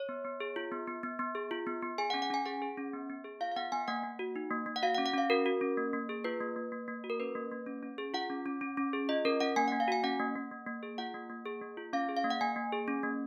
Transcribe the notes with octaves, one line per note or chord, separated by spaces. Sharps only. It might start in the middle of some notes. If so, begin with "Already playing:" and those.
Already playing: C#5
B3
B3
G#4
F4
B3
B3
B3
B3
G#4
F4
B3
B3
G#4 G#5
F#5
C#4
F#5
C#4 G#5
G#4 F#5
G#4
C#4
B3
B3
G#4
F4 F5
F5
B3 F#5
B3 G#5
A#3 F#5
A#3
F#4
D#4
A#3
A#3
F#5
F#4 F5
F#5
C#4
F#5
C#4 F5
F#4 A#4
F#4
C#4
A#3
A#3
G#4
F4 B4
A#3
A#3
A#3
A#3
F#4
A#4
C#4 B4
A#3
A#3
C#4
C#4
G#4
F4 F#5
C#4
C#4
C#4
C#4
G#4
F4 D#5
C#4 A#4
C#4 F#5
A#3 G#5
F#5
A#3
F5
F#4 G#5
C#4 F#5
A#3
A#3
A#3
A#3
G#4
F4 F#5
A#3
A#3
G#4
A#3
F4
C#4 F5
G#4
F5
A#3
F#5
A#3 G#5
A#3
G#4
C#4
A#3